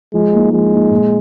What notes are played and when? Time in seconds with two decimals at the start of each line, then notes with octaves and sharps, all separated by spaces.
0.13 F3 G#3
0.33 A#3 D#4
0.53 F3 G#3
0.71 A#3 D#4
0.91 A#2